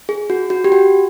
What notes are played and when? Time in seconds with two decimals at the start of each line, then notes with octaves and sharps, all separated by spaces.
0.09 G#4
0.30 F#4
0.50 F#4
0.64 G4
0.72 F#4